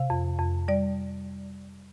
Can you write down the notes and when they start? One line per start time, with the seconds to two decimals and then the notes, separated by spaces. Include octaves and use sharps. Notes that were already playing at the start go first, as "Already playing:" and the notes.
Already playing: C3 F5
0.10 F2
0.39 F2
0.68 G3 D5